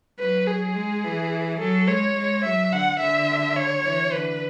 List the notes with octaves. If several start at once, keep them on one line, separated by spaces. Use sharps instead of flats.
F#3 B4
G#4
G#3
E3
F#3 A4
G#3 C#5
G#3
F#3 E5
D3 F#5
D3 E5
C#5
E3
D3 B4